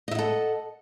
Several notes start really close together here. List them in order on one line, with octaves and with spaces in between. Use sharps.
D#5 E5 F#5 A4